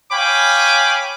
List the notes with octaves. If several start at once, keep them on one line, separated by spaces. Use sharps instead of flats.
C#5 F5 G5 G#5 B5 D6